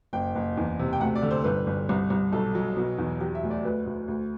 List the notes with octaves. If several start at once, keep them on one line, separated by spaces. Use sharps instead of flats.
F#1 G5
F#1
E2
C3
G5
D2 F#5
D5
D3
C5
G1 B4
G1
C2
C2
B1 A4
F#3
B2
E2
F#3 G4
E5
D2
D5
D2 B4
D2
D2